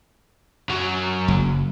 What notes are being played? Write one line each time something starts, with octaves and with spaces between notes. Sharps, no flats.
F#2 F#3
F#1